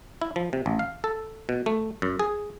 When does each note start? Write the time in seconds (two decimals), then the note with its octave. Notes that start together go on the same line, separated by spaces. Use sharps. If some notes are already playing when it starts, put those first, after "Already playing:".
0.22 E4
0.36 F3
0.53 C3
0.66 A1
0.79 F5
1.04 A4
1.49 B2
1.66 A3
2.02 F#2
2.20 G#4